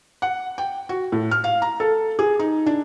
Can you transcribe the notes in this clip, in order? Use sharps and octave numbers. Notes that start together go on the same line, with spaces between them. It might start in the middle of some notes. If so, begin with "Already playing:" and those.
F#5
G5
F#4
A2
F6
F5
A#5
A4
G#4
D#4
D4